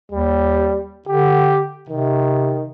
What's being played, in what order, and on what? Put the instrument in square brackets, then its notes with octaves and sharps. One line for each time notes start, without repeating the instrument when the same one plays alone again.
[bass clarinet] D#2 [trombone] G3
[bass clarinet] D3 [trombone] G4
[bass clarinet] C3 [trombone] D#3